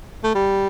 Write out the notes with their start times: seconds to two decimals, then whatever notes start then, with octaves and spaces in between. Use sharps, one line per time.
0.24 A3
0.35 G3